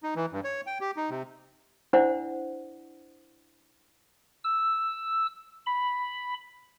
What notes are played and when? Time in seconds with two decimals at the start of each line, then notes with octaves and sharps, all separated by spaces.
0.03 D#4
0.16 E3
0.32 G2
0.44 C#5
0.67 G5
0.81 G4
0.96 D#4
1.10 C3
1.93 D4 E4 C5 D5 F#5
4.44 E6
5.66 B5